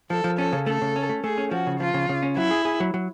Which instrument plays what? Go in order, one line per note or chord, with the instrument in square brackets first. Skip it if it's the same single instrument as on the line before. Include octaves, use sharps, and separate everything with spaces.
[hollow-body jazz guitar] F3 [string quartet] A4
[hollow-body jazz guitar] F3
[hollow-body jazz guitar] C#4 [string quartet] A4
[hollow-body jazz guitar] C#3
[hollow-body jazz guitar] A3 [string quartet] A4
[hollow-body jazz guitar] C#3
C#4
A3
[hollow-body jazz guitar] A3 [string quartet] G#4
[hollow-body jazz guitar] C#4
[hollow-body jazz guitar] F3 [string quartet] F#4
[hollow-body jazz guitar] C#3
[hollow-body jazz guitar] F3 [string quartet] F4
[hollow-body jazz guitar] C#3
C#3
C#4
[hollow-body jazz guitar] F#3 [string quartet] E4
[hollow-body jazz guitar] G#4
G#4
F#3
F#3